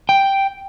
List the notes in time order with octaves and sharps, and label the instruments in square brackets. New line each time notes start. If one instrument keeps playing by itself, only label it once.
[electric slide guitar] G5